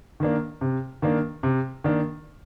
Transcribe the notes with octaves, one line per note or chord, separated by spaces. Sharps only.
D#3 A#3 D4
C3
D#3 A#3 D4
C3
D#3 A#3 D4